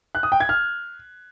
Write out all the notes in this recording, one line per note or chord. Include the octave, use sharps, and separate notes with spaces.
F#6
D#6
G5
G#6
F6